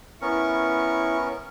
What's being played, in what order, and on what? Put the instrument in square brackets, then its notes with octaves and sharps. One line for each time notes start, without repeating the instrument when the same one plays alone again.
[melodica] B3 C#4 A#4 [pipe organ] E4 C#6